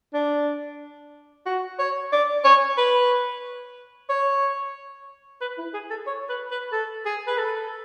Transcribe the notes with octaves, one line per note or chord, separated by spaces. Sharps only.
D4
F#4
C#5
D5
C#5
B4
C#5
B4
E4
G#4
A4
C#5
B4
B4
A4
G#4
B4
A4